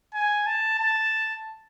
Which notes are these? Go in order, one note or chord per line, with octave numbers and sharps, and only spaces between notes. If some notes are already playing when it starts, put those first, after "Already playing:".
G#5
A5
A5